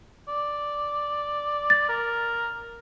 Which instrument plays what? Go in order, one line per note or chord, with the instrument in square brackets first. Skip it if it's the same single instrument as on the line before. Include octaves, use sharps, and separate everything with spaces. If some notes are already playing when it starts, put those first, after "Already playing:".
[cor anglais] D5
[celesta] A6
[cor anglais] A#4